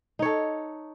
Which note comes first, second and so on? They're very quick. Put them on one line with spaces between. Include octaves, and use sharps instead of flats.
D#4 C#5 A4